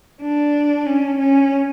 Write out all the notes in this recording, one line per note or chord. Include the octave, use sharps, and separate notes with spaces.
D4
C#4
C#4